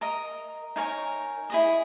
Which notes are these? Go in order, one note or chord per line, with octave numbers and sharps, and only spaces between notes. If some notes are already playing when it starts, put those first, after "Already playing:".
A#4 D#5 A#5 D#6
D#4 A#4 C#5 G#5
E4 G#4 D#5